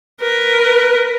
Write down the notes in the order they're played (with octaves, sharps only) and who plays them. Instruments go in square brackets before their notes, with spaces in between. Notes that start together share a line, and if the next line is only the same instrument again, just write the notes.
[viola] A#4 B4